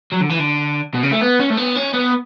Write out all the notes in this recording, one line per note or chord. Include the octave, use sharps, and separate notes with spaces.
F#3
D3
E3
D3
B2
C#3
A3
B3
C#4
A3
B3
C#4
B3